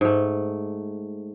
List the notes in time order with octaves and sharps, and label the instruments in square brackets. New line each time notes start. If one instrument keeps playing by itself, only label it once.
[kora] G#2 A3